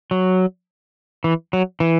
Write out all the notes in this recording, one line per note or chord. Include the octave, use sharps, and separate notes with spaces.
F#3
E3
F#3
E3